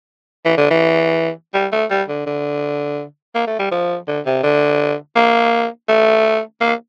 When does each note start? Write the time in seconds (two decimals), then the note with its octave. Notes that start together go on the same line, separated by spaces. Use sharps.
0.45 E3
0.57 D3
0.71 E3
1.54 G3
1.72 A3
1.90 G3
2.09 D3
2.26 D3
3.35 A#3
3.47 A3
3.59 G3
3.71 F3
4.08 D3
4.26 C3
4.43 D3
5.16 A#3
5.89 A3
6.61 A#3